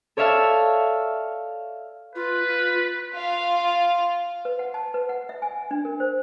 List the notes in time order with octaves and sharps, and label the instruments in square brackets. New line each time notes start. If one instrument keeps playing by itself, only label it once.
[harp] A4 C#5 D5 E5 F5 A5
[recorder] F4 [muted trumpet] B4
[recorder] F4
[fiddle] F4 F5
[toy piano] B4
F#5
A5
B4
F#5
E5
G#5
D4
A#4
C5